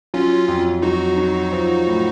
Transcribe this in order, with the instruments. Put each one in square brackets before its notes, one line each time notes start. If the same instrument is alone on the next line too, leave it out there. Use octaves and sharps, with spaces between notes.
[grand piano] F#3 [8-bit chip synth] C#4 F4
[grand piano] F2
[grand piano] F#3 [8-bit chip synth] D#4 F#4
[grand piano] F#3
F3
A2